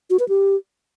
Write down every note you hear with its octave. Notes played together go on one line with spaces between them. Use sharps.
F#4
B4
G4